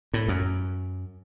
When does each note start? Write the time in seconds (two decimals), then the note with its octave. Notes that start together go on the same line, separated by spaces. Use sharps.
0.14 A2
0.28 F#2